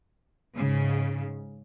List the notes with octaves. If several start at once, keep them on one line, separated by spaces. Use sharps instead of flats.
G#2 C#3